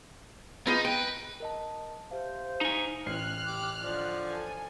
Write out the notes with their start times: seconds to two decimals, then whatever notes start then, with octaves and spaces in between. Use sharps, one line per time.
0.67 B3 D#4 F4 G#4
0.85 B4 G5
1.40 A#4 D#5 A5
2.11 G4 C5 E5 F5
2.61 D#4 G#5
3.06 A1 C#4 F6 F#6 C7
3.46 G4 D6
3.81 D3 F3 D5
4.26 A4 G#5